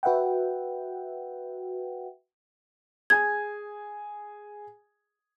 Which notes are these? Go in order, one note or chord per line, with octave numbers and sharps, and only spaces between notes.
F#4 B4 E5 F#5 G5
G#4 G#5 G#6